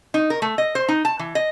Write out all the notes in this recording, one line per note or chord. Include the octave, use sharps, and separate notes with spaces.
D#4
A#4
A3
D#5
C5
D#4
A5
E3
D#5